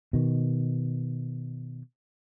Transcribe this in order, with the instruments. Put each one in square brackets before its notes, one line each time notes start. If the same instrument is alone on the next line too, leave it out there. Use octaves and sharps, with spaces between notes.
[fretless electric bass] B2 D#3